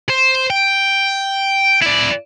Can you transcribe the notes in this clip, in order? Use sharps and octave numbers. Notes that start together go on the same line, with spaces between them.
C5
G5
E4 D5